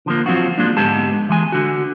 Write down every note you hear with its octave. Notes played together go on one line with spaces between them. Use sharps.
D3 F3 A#3
F3 F#3 C4 F4 F#4
F3 G#3 A#3 D4
G#2 D3 G#3 B3 G4 A5
E3 G#3 G#5
D3 F#4